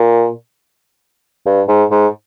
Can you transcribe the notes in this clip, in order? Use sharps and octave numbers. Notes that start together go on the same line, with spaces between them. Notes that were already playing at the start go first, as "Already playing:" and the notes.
Already playing: A#2
G2
G#2
G#2